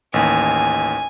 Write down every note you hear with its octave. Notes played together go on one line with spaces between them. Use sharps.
A1 D#2 G#5